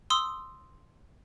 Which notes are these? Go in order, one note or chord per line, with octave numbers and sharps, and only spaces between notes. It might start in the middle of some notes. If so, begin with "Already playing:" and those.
C6 D#6 E6